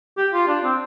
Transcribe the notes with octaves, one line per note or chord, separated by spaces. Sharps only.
G4
F4
D4
C4